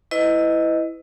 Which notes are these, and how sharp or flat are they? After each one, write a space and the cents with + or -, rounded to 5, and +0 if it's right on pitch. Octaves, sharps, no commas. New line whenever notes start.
E4 +0 B4 +30 D#5 +0